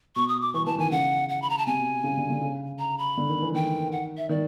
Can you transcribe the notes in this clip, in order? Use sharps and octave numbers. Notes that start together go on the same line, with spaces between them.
B2 C#6
D#6
D6
E3 C#6
E3 A5
D#3 G#5
C#3 F#5
F#5
B5
A#5
A5
C3 G#5
B2
C#3
D3
D3
C#3
A#5
B5
D3
D#3
E3
D#3 G5
F#5
E5
D#3 D5